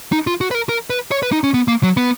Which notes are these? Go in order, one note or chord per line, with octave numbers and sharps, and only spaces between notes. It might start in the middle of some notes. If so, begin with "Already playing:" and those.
D#4
F4
F#4
B4
A#4
A#4
B4
C#5
B4
D#4
C#4
B3
A#3
F#3
B3